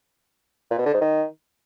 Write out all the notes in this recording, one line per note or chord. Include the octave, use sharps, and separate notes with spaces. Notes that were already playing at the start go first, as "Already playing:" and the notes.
A#2
B2
D3
G#2
D#3